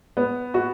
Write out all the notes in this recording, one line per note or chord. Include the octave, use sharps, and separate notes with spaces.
B3
F#4